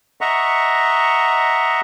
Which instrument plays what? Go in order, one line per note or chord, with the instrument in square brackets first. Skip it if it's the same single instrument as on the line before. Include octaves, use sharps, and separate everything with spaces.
[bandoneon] D#5 E5 F#5 A#5 C#6